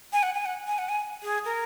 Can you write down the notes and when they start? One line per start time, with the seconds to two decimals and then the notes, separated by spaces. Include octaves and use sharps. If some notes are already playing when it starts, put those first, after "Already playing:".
0.13 G#5
0.23 F#5
0.34 G#5
0.46 F#5
0.67 G#5
0.78 F#5
0.89 G#5
1.23 G#4
1.45 A#4